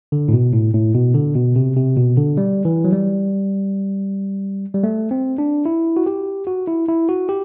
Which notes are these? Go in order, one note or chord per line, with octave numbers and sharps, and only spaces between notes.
D3
A2
B2
A2
A2
B2
D3
B2
C3
C3
B2
D3
G3
E3
F#3
G3
G3
A3
C4
D4
E4
F#4
G4
F#4
E4
E4
F#4
G4